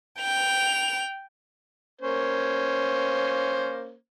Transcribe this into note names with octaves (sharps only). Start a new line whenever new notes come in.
G5 F7
A#3 C#4 C5